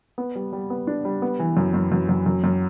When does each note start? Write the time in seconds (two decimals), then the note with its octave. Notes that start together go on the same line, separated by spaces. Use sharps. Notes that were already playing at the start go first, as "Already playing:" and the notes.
0.18 B3
0.35 G3
0.53 G3
0.70 B3
0.87 D4
1.05 G3
1.22 B3
1.39 E3
1.57 F#2
1.74 F#2
1.92 F#2
2.09 F#2
2.26 F#2
2.44 F#2